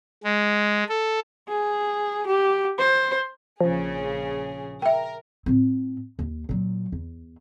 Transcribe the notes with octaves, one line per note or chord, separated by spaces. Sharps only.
G#3
A4
G#4
G4
C5
A#1 C#3 F3 G#4
A#4 E5 G5
A2 C4
D#2
A#2 F#3
E2